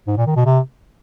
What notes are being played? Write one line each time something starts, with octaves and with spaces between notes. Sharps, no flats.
G#2
A#2
D#3
B2
C3